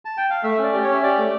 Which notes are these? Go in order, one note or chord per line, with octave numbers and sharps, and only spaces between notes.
A5
G5
F5
A3 E5
C#4 D5
G4
C#5
C#4
E5
G4 D5
A3